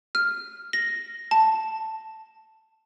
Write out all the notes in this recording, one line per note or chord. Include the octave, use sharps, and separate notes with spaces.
F6
A#6
A5